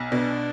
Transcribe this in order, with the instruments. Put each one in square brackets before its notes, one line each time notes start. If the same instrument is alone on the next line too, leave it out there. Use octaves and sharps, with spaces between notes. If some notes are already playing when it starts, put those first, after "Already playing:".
Already playing: [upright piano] B1
[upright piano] B2 [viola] D4